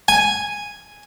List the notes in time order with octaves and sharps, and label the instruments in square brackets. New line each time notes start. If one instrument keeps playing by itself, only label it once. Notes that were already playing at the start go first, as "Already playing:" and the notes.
[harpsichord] G#5